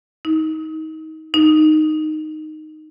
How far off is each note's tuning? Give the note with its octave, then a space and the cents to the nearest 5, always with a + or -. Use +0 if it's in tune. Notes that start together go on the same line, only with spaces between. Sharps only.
D#4 +25
D#4 -5